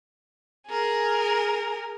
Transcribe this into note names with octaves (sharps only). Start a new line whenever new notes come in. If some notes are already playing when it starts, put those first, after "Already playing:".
G#4 A#4